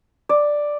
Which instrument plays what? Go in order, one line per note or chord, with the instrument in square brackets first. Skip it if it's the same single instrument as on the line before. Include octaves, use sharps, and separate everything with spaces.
[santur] D5